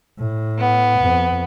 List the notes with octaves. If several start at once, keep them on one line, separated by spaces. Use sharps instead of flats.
A2
B3
F2